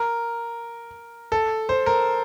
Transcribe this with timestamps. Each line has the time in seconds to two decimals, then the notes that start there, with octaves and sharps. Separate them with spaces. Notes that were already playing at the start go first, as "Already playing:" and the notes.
Already playing: A#4
1.32 A4
1.69 C5
1.86 A#4